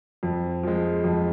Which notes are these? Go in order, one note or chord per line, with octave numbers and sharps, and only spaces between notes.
F2
F3 G#3
F2